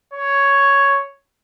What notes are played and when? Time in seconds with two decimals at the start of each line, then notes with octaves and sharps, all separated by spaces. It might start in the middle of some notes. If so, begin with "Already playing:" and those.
0.14 C#5